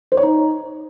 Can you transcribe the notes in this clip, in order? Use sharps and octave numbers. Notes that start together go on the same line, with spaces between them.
C5
C#5
D#4